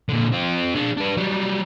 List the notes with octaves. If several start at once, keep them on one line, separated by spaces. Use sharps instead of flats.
A#2 D3
C4 F4
D4 G#4
D4 B4
F#3 G3